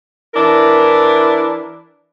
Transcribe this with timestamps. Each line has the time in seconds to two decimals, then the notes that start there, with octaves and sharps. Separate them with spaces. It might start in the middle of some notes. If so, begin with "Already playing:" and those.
0.34 E3 D4 E4 A#4